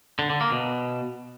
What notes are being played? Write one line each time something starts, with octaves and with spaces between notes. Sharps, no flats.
D3
D3
A#3
B2